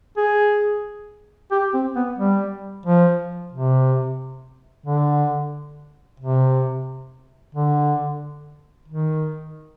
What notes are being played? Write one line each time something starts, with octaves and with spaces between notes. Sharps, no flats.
G#4
G4
C4
B3
G3
F3
C3
D3
C3
D3
D#3